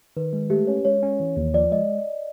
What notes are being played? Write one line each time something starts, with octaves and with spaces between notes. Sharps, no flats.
D#3 B4
G#3
A3 G4
C#4 C#5
G#3 C#5
C#4
E3
D#2
F3 D5
G#3 D#5